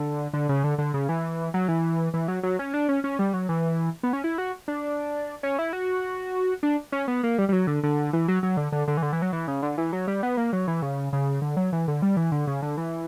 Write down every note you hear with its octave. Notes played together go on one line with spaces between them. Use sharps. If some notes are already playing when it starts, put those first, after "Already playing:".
Already playing: D3
D3
C#3
D3
D3
C#3
E3
F#3
E3
E3
F#3
F#3
C#4
D4
C#4
C#4
G3
F#3
E3
B3
C#4
E4
F#4
D4
C#4
E4
F#4
D4
C#4
B3
A#3
G3
G3
F#3
D3
D3
E3
F#3
F#3
D3
D3
D3
E3
D3
E3
F#3
E3
C#3
D3
E3
F#3
G3
B3
A#3
F#3
E3
C#3
C#3
D3
F#3
E3
D3
G3
E3
D3
C#3
D3
E3